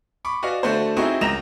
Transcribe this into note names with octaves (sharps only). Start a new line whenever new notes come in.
B5 C#6 D6
F#4 B4 D5 D#5 F5 G#5
D3 A3 F#4 C5
C4 D#4 E4 F#4 G#4 D#5
C#2 A#4 A#5 A#6 E7 F7